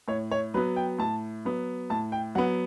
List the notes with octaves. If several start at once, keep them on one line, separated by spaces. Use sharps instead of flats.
A2 C#5
C#5
F#3 B3 B4
G5
A2 A5
F#3 B3
A2 A5
G5
F#3 B3 F#5